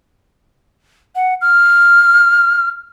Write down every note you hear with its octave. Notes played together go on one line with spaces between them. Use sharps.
F#5
F6